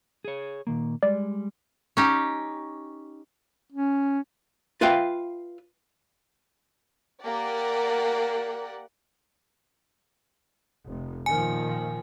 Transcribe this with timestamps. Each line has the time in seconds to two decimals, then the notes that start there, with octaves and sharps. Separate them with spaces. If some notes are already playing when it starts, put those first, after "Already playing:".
0.25 G#4 C#5
0.67 A#2 D#3 A#3
1.03 G3 G#3 D5
1.97 C#4 D#4 G4
3.72 C#4
4.81 F4 B4 E5 F5 G5
7.23 A#3 G4 D5 F#5
10.85 F1
11.26 A#2 D#3 F3 G#5